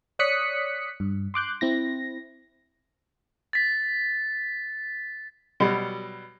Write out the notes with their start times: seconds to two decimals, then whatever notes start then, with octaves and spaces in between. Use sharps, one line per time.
0.19 C#5 D5 D#6 F#6 B6 C#7
1.00 G2
1.34 C6 D6 F#6 G6
1.61 C4 E4 A#6
3.53 A6 B6
5.60 B2 F#3 G3